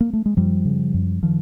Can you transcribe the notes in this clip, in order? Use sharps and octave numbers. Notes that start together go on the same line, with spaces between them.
A#3
A3
G#3
F#2 F3 G3
C#3
F#2
D#3 F3